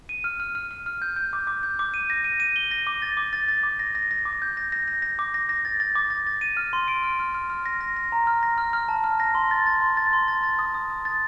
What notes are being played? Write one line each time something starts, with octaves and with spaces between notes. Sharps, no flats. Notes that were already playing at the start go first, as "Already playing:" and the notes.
D#7
F6
F6
F6
F6
F6
G6
G6
D6
D6
G6
D6
D#7
A#6
D#7
D#7
G7
A#6
D6
A6
D6
A6
A6
D6
A#6
A#6
A#6
D6
G6
A#6
A#6
A#6
A#6
D6
A#6
A#6
A6
A6
D6
A6
A6
D#7
F6
C6
D7
F6
F6
F6
F6
A#6
A#6
A#6
A#5
F6
A#6
F6
F6
A5
F6
A#6
C6
A6
A6
C6
A6
C6
A6
A6
D#6
D#6
D#6
A6